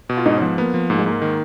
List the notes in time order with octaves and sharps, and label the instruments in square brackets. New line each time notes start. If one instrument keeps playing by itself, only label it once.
[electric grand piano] B2
[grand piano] F4
[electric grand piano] G#2 [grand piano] D#4
[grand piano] C#4
[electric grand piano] F3 [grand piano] B3
[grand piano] A#3 [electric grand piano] B3
[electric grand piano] F3
[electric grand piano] G#2 [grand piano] A#3
[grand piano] G#3
[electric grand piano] G#2 [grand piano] A#3
[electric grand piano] D#3